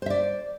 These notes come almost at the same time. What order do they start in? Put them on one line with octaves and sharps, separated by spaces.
C5 E5 D5